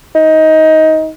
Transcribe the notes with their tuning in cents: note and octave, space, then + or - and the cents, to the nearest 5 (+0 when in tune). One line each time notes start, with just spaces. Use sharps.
D#4 +20